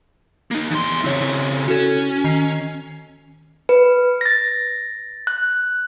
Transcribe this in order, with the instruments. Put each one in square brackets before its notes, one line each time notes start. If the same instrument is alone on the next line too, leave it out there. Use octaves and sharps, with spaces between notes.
[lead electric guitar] A#3 D#4
E2 C6
[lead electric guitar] C#3 C4 [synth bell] E4 C#5
[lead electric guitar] C#4 [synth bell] F#4 A4
[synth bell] D#3 C7 F7
[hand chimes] B4
A6 A#6
F#6